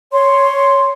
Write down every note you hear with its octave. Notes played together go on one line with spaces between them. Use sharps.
C#5 C6